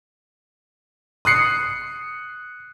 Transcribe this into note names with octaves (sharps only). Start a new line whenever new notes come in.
D#6 F#6 C7 C#7